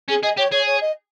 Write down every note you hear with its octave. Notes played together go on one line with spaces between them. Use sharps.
C#4 G#4
G#4 D#5
G4 C#5
G#4 C#5
C#5
D#5